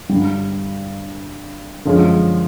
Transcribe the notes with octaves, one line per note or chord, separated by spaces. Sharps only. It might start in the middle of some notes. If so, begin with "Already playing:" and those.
G2 D3 G3
F#2 D3 F3 G#3 C#4